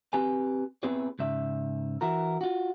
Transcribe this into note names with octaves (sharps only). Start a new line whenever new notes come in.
C4 G4 B4 G#5
B3 C4 E4 G#4 B4 C#5
G#2 C#3 E5
E3 E4 F#4 A#4
F4 F#4